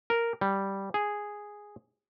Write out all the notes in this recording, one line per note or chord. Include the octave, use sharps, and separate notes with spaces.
A#4
G3
G#4